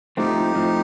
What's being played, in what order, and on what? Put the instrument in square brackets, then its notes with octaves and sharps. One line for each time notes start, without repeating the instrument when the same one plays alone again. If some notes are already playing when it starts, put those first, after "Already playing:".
[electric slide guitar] A2 F3 A3 C4 [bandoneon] D#4 G4
[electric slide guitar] A2 F3 A3 C4